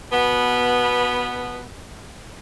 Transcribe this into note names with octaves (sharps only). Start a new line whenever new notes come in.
B2 B3